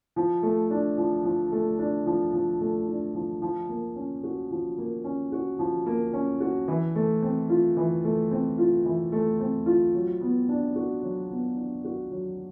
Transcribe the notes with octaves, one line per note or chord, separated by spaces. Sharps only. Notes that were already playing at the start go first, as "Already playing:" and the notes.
F3
A3
D4
F3
F3
A3
D4
F3
F3
A3
D4
F3
F3
A#3
C#4
F#4
F3
A#3
C#4
F#4
F3
A#3
C#4
F#4
E3
A3
C4
F4
E3
A3
C4
F4
E3
A3
C4
F4
F#3
B3
D4
F#4
F#3
B3
D4
F#4
F#3